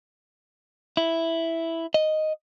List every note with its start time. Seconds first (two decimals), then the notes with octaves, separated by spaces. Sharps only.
0.97 E4
1.94 D#5